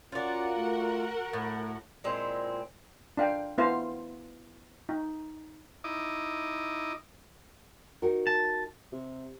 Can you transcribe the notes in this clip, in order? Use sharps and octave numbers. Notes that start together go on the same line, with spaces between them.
C#4 F4 F#4 A#4 D5 F#5
A3
A2 A3
A#2 G#3 C4 E4
D4 F5 G5
B3 E4 C5 F5
D#4
D#4 E4 D#5 D6
D#4 F#4 A#4
A5
C3